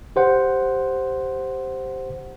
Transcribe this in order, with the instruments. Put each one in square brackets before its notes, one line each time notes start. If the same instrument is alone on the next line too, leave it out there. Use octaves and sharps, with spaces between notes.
[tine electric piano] G4 C5 F#5